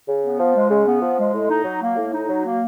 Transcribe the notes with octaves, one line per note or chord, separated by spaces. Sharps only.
C#3
B3
F3
G#3
C#3
B3
F3
G#3
A2
D#4
F#3
A#3
A2
D#4
F#3
A#3